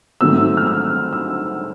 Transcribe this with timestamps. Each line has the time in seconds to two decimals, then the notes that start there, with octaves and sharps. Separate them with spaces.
0.21 G#2 D#3 F#3 A3 C4 E6
0.57 F6
0.67 E6
1.13 E6